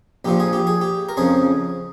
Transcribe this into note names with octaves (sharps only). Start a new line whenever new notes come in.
A#1 A#2 F3 G4
G#4
G4
G#4
G4
A#4
F2 C#3 F3 G#4